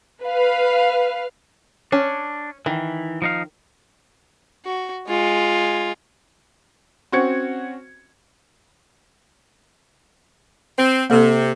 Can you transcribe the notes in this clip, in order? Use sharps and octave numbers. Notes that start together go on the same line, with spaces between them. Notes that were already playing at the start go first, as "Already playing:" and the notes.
B4 F5
C#4 D4
D#3 E3
F3 D#4 F5
F#4
G#3 F4
C4 C#4 F#4 G#6 C#7
C4
C3 A#3 A4